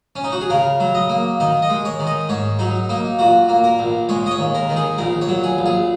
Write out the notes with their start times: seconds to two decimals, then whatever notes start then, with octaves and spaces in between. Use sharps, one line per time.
0.16 C#4
0.24 D#4
0.32 F#4
0.41 G#4
0.50 C#3 A#4
0.80 F#3
0.95 D#5
1.09 A#3
1.40 D#3 D#5
1.62 D#5
1.69 G#3
1.85 C#5
1.99 D#3
2.07 D#5
2.29 G#2 C#5
2.59 F#3 D#4
2.89 A#3 D#4
3.19 A#2 F#4
3.49 A#3
3.64 A#4
3.79 A#1
4.09 G#3 C#5
4.26 D#5
4.31 C#5
4.38 D#2
4.54 A#4
4.69 D#3
4.76 G#4
4.98 A#1 A#4
5.21 C#5
5.28 F#3
5.44 G#4
5.58 A#1
5.66 G#4